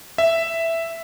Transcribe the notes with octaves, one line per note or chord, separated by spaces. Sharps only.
E5